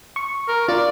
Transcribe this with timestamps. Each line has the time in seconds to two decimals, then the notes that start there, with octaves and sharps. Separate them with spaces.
0.16 C#6
0.48 A#4
0.68 F4 D5